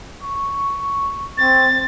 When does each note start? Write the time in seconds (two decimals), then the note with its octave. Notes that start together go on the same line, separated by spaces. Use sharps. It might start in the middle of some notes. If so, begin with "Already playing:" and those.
0.22 C#6
1.38 C4 A6